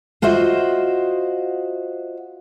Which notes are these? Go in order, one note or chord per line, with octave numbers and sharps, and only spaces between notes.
F4 F#4 C5 D#5 E5